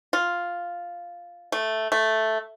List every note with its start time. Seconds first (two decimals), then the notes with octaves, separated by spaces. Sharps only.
0.13 F4
1.52 A3
1.92 A3